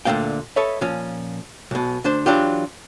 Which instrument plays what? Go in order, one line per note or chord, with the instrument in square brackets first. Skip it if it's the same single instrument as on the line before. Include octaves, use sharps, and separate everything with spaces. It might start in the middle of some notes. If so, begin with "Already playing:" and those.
[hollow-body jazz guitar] D2 A#2 D3 A#3 F5 G5
A4 B4 C#5 D#5 E5
A#2 F3 C#4
B1 B2
D2 D4 C5
E3 F#3 D4 F4 G4